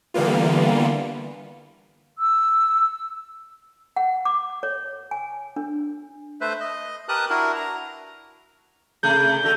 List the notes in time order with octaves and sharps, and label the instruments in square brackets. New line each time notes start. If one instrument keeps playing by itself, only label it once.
[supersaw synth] D3 E3 G3 A#3 B3 F4
[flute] E6
[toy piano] F#5
D6
C#5
G#5
D4
[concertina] A3 B4 C5 E5
D#5
G4 A#4 B4 A5 D#6 F#6
D4 E4 F#4 A#4
A#5
[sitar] C3 A3 G#4 [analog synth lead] G6
[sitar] D3 F#4 A4